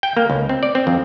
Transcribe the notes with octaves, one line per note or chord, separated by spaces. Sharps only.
G5
A#3
C#2
C4
D5
C4
F2